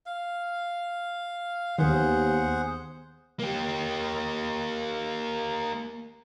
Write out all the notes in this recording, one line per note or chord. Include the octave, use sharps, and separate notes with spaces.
F5
D#2 D#3 B3 G#4 C5 F#5
A#3 G4